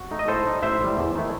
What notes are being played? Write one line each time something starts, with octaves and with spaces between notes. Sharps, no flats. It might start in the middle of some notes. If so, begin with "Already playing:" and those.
Already playing: F#4
A3 D#4
D#5
A2 A4 C5
G3 D#4
A1 C5 E5
A2 G3
E2
D#3 A3 E4